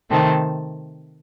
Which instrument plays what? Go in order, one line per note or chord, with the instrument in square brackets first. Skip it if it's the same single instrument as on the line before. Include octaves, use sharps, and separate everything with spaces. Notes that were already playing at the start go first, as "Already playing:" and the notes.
[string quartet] C3 D#3 A3 C4 A5